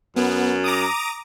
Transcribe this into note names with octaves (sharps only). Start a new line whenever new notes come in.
F#2 B3
A#5 D6 D#6